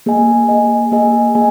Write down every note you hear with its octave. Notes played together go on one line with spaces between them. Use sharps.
A#3 G#4 D#5 G#5
A#3 G#4 D#5 G#5
A#3 G#4 D#5 G#5
A#3 G#4 D#5 G#5